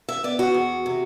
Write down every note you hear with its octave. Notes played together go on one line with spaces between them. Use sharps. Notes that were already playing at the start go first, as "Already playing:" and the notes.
E5
B3 D5
F#4
E2
C3